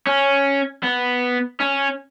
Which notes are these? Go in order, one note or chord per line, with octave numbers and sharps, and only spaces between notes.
C#4
B3
C#4